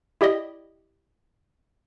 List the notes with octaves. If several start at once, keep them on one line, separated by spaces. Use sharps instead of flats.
E4 G4 D5 D#5